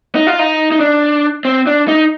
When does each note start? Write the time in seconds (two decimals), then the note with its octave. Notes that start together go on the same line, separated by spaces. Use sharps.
0.15 D#4
0.27 F4
0.39 D#4
0.72 D#4
0.80 D4
1.45 C4
1.67 D4
1.88 D#4